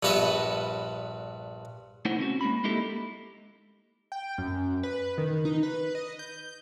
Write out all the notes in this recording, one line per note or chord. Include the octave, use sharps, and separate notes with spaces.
A#1 G2 B3 B4 D#5 E5
A3 D#4 E4 C5 C#5 F#5
D3 C4 C#4 F#4
G#3 A#3 B5
G#3 A#3 D#4 E4 G4 A4
G5
F#2
B4
D#3
D#4
B4
D#5
G6